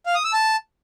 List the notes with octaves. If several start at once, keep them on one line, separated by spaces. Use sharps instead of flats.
F5
D#6
E6
A5